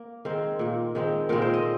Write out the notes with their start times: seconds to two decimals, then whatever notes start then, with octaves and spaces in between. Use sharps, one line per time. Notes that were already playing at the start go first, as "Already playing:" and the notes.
Already playing: A#3
0.25 D#3 G#3 C4 F5
0.59 A#2 A#3
0.95 D#3 G#3 C4
1.29 A#2 G#3 C4 A#4
1.42 C5
1.53 D#5